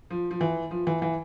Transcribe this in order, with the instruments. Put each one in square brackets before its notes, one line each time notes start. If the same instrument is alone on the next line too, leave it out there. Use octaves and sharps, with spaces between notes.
[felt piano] F3
F3
E3
F3
E3
E3